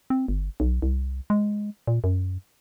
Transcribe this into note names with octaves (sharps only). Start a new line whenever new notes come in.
C4
G1
B1
C2
G#3
A#2
F#2